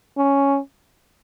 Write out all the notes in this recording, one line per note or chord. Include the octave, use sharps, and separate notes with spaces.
C#4